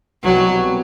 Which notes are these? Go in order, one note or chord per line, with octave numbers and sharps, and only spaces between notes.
C2 B2 F#3 G3